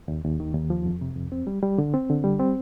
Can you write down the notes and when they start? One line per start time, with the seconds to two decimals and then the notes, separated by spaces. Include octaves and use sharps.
0.08 D#2
0.24 D#2
0.40 D#3
0.55 D#2
0.70 F3
0.86 F2
1.01 C3
1.16 F2
1.32 C4
1.47 G3
1.63 G3
1.78 D3
1.94 C4
2.10 D3
2.24 G3
2.39 C4